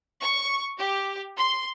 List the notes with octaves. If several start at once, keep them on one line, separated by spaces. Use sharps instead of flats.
C#6
G4
C6